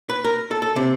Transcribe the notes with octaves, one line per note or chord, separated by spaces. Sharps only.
B4
A#4
A4
A4
C3